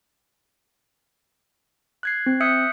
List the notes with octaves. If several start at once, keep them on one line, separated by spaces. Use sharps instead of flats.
F#6 G#6 C7
C4
E5 D#6 E6 F#6 G6 C#7